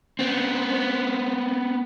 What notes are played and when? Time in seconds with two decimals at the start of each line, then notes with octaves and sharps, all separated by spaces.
0.19 B3 C4